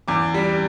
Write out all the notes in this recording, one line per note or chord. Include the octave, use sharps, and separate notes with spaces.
E2 D6
G3